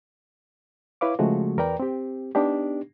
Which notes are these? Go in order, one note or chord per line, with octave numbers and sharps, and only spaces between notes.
E4 B4 C#5 F5 D6
C#3 F3 G#3 A3 F#4
E2 A#4 B4 D5 G5 A#5
C4 G4
B3 D4 D#4 G4